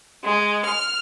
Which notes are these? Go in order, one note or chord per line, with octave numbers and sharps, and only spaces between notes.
G#3
F6